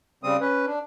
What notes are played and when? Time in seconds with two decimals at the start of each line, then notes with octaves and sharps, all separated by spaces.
0.24 C#3 G3 C4 D#6
0.41 C#4 B4
0.66 D4